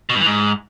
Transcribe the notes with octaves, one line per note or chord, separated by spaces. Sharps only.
B2
G2
E3
G#2